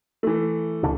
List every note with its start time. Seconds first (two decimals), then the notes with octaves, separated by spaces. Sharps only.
0.23 E3 A3
0.83 C#2 C#3 D4